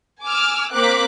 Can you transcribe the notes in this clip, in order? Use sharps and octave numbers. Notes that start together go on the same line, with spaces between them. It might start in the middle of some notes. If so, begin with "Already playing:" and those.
G#5 D6 E6 F6
A#3 C4 A#4 D6 F#6 B6